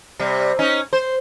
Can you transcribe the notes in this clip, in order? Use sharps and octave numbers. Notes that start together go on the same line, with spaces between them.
C3 G3
C#4 D#4
C5